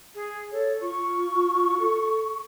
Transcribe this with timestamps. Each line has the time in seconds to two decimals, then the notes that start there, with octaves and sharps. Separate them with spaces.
0.15 G#4
0.52 A4 C#5
0.81 F4 C#6
1.79 A4